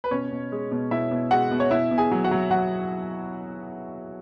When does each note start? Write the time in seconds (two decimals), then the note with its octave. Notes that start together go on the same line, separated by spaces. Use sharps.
0.04 B4
0.11 B2 C#4 C#5
0.32 B2
0.52 G#3
0.71 B2
0.91 B2 E4 E5
1.11 B2
1.31 G#3 F#4 F#5
1.51 B2
1.60 C#5
1.71 B2 E4 E5
1.91 B2
1.98 G#4 G#5
2.12 F#3
2.24 F#4 F#5
2.31 F#3
2.51 F#3 F#4 F#5